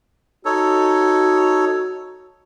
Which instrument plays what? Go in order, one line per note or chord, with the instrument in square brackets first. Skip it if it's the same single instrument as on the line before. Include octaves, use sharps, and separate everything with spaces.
[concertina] D#4 A4 C#5 [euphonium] F#4